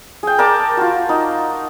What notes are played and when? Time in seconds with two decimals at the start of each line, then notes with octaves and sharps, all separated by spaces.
0.23 G#4 G5
0.39 A#4 D5 A5 D6
0.77 F4 F#4
1.09 D#4